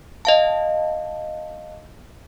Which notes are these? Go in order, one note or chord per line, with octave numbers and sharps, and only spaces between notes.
D#5 F5 A5